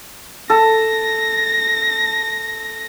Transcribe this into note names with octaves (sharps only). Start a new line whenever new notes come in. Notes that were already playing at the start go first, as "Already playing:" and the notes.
A4 A#6